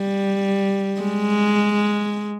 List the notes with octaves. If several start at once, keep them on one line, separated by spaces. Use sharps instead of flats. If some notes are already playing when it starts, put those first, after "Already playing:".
Already playing: G3
G#3